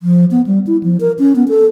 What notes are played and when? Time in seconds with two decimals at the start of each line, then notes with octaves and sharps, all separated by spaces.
0.03 F3
0.31 B3
0.46 G3
0.67 E4
0.83 F3
1.00 A#4
1.19 C#4
1.36 B3
1.49 A4